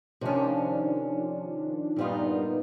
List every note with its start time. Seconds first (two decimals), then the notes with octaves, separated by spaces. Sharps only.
0.21 C3 D#3 F3 C#4 D4
1.96 G2 A#2 G3 B3 D#4 F4